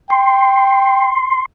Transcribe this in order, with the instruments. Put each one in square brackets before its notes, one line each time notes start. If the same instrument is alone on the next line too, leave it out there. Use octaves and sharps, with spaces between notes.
[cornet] G5 [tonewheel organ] C6